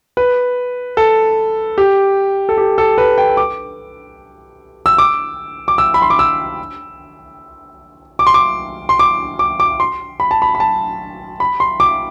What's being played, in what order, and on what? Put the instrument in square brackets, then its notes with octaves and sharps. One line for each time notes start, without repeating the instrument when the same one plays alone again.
[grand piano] B4
A4
G4
A4
G4
A4
B4
G5
D6
E6
D6
D6
E6
B5
C6
D6
E6
D6
C6
D6
C6
D6
D6
D6
C6
B5
A5
B5
B5
A5
B5
C6
D6